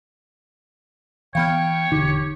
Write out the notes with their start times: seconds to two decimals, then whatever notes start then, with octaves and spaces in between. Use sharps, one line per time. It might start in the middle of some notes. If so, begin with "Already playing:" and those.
1.35 E3 B3 C#5 F5 G5 B5 F6
1.92 E1 D3 D#4 G4